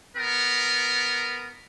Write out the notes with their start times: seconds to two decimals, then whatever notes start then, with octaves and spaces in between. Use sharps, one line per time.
0.17 B3 A#4